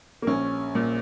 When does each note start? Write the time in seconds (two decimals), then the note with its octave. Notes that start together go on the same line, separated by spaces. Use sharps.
0.22 A#3
0.27 A#1 C#4
0.75 A#2